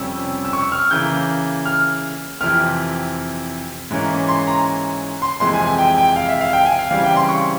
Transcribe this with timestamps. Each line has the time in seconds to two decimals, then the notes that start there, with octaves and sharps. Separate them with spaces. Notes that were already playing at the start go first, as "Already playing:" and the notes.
Already playing: F2 C3 G3 C#4 E6
0.45 E6
0.53 C#6
0.72 F6
0.91 C#3 E3 A#3 G6
1.65 F6
2.41 F2 C3 E3 F6
3.91 G#2 E3 A#3 C#4
4.28 C6
4.47 A#5
5.22 C6
5.40 F2 C3 E3 G#3 C6
5.54 G#5
5.66 G#5
5.79 G5
5.98 G5
6.16 F5
6.28 E5
6.41 F5
6.53 G5
6.65 G#5
6.79 F5
6.91 C#3 E3 G3 C4 F5
7.04 G5
7.16 C6
7.29 C#6